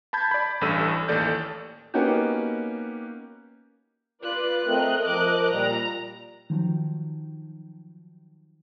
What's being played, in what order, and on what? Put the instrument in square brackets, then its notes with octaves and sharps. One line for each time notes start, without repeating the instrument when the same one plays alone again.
[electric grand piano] A5 B5 G6 G#6
D5 B5
A1 G2 A4 E6 D#7
A1 D#2 A4 D5 G6
[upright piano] A#3 B3 C#4 D#4 F#4 G4
[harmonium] F4 [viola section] B4 D5 [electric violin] F#6
[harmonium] A3 C4 [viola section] A#4 D#5
[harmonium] F3 [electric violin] D6 F#6
[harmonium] A#2 G3 [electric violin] A#5
[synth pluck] D#3 F3 F#3